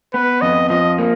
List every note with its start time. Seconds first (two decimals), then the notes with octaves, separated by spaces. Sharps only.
0.14 B3 B4
0.41 F2 D#5
0.69 F3 D#5
0.98 A#3